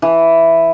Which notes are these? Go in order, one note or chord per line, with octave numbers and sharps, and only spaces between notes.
E3